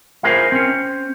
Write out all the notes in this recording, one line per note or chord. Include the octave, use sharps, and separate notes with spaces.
E4 F4 G#4 A#4 C5
C4 C#4